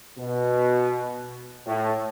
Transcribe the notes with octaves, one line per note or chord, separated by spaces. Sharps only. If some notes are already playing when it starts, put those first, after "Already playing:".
B2
A2